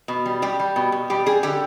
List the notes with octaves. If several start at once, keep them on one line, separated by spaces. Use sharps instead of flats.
B2
G3
G3 G4
G3
B2
B2
G3 G4
G3 G#4
D3 G4